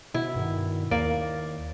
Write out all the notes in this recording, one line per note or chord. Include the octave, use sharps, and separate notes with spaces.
B2 E4
G2 B2 D#3
D#2 A#3 D5